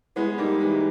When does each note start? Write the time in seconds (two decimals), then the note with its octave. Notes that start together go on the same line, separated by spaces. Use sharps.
0.16 G#3 B3 E4
0.38 G3 A#3 D#4
0.60 E3 G#3